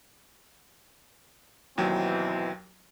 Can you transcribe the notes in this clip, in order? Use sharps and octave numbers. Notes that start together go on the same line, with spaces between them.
D#2 B2 E3 F#3 C4 G5